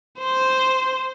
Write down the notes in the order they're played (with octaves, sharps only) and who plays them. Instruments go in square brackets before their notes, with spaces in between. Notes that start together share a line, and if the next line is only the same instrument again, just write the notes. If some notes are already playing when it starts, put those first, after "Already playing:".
[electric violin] C5